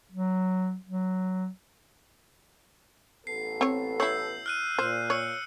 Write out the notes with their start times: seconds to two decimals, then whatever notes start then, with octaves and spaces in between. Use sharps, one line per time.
0.12 F#3
0.87 F#3
3.27 A1 B3 A4 C7
3.61 C4 C#5
4.00 E4 C#5 E6 G6 C7
4.46 F6 F#6 D#7
4.79 A#2 C5 F6 F#6
5.10 C#5 E6 C#7